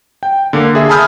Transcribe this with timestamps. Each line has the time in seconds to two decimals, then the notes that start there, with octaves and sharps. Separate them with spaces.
0.23 G5
0.53 D3 A#3
0.75 G#4 E5
0.89 G#5 A5 B5 D#6 F6 G6